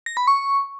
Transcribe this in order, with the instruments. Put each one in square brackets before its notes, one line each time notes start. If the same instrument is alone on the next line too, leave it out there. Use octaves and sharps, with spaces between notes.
[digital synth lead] A#6
B5
C#6